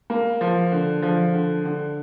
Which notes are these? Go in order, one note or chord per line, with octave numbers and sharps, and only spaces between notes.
A#3
F3
D3
F3
D3
D3